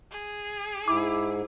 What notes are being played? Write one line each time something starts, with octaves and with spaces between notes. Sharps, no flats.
G#4
G#2 E4 D6